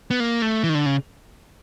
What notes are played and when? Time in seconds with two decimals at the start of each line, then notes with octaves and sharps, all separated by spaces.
0.11 B3
0.20 A#3
0.42 A3
0.64 E3
0.69 D#3
0.75 D3
0.86 C#3